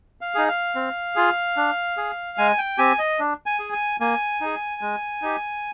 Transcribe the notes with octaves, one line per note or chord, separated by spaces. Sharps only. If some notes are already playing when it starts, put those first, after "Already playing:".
F5
D#4 G#4
F5
C4
F4 G#4
D4
G#4
G#3 G#5
G5
C4 G4 G#5
D#5
D4
G#5
G#4
G#5
A#3 G#5
D#4 G#4
G#3
D#4 G4